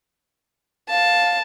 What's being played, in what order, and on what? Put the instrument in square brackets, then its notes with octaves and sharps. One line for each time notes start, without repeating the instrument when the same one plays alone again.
[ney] F5 [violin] A5